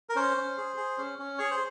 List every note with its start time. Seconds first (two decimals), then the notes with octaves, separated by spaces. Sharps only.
0.09 A#4
0.16 C#4 C5
0.37 C#4
0.57 G#4
0.77 G#4
0.98 C#4
1.19 C#4
1.38 G#4 C#5
1.51 C5